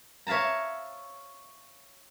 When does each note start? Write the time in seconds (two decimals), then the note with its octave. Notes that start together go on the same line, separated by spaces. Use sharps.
0.27 C#5 E5 F5 A5 A#5